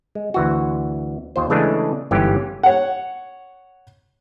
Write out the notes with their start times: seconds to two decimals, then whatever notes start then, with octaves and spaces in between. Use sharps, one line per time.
0.15 G#3
0.34 D2 E3 F#4
1.36 D#2 F4 C5
1.50 C#3 E3 G#3 A3 D4 G#4
2.11 G1 G#2 E3 C#4 G4
2.63 C#5 F#5